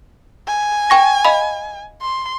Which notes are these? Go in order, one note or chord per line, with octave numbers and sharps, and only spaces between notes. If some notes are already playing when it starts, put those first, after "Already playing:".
G#5
G5 C#6 A#6
D#5 F5 B5
C6